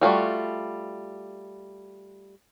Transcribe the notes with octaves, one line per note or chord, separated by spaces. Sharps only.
G3 A3 F4 F#4